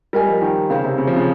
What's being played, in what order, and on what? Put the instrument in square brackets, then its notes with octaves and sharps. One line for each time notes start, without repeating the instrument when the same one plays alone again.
[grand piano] G3 [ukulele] A#4 D#5 G#5
[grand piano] F3
D#3
[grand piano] C#3 [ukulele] D#4 G4 C5 F5
[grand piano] C3
C#3
F3
C#3